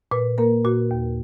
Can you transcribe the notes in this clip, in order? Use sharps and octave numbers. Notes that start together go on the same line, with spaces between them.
A#2 B4
A#3 A#4
A#2 F#4
D#2